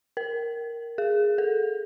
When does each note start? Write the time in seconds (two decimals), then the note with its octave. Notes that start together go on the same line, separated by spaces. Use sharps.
0.17 A#4
0.98 G#4
1.38 A4